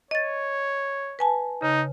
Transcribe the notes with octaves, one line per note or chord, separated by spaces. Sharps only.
C#5 D#5 A6
B4 G#5 A5
C#3 D#4